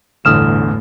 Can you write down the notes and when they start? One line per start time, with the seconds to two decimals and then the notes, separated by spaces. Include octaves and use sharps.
0.25 G1 E2 A2 D3 D#6 F6 E7